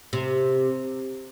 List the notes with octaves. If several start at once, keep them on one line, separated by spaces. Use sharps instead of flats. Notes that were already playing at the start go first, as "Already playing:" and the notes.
C3